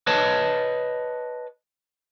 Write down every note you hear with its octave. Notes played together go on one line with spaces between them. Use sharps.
B4 C#5 D#5 A5